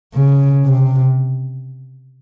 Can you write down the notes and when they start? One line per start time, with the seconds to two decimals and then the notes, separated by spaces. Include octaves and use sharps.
0.14 C#3
0.64 C3